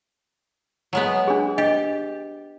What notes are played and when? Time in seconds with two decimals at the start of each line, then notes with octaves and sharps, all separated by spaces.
0.93 F#3 G#3 B3
1.28 D4 G#4
1.58 D4 G4 D#5